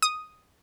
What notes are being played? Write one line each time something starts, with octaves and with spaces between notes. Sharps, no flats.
D#6